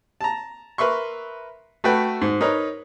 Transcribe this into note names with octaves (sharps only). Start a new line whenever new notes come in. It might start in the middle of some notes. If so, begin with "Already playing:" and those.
A5 A#5
A#4 B4 E5 C6 C#6
A3 F#4 A4 B4 G5
G#2
D#4 A#4 B4 C#5